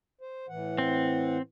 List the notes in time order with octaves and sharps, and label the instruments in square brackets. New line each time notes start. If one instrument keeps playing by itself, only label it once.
[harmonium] C5
A2 E3 F#5
[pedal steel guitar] C4